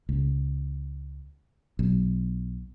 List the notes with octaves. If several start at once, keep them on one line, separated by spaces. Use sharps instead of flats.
C#2
B1